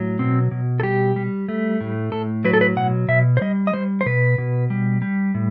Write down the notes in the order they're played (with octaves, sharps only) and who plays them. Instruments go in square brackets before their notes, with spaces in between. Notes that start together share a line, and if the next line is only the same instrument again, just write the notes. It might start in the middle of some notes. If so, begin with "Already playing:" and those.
Already playing: [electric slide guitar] A2 F#3
B2 C4
B2
A4
G3 G4
G3
A3
A2
A2 A4
F#3 B4
A4
B4
B2 F#5
B2 E5
C5
G3 D#5
D#5
G3 C5
C5
B2 B4
B2
G3
G3
A2